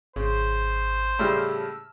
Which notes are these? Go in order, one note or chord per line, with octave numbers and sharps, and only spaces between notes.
G#1 C#3 C5
A2 C#3 G3 A5 E6 F6